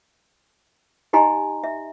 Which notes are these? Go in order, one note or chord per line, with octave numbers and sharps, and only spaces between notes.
D#4 G4 D#5 G#5 A#5 C6
E5